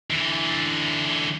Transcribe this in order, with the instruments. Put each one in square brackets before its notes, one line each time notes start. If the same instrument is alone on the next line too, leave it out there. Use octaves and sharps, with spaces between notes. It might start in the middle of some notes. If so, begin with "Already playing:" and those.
[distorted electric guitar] D3 E3